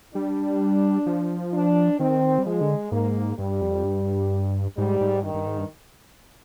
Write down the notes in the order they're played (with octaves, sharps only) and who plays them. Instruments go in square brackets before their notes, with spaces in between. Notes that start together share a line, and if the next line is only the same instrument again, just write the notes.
[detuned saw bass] G3 [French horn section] D4
[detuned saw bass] F3
[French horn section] D4
[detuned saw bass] D#3 [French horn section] C4
[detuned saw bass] G3
[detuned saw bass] F3 [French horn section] G#3
[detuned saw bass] D3
[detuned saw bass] G#2 [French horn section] A#3
[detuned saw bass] G2 [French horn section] G3
[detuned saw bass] F2
G2
[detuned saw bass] G#2 [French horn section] G3
[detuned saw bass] G#2
[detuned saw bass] G2 [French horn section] D#3
[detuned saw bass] G2
G#2
G2